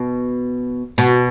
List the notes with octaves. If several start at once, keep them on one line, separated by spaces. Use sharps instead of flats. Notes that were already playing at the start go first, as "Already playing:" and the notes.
Already playing: B2
B2